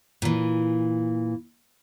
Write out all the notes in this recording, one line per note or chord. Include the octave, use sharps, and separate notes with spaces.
A#2 E3